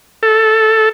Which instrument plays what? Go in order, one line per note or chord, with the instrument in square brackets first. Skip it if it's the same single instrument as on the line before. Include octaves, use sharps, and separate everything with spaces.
[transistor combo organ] A4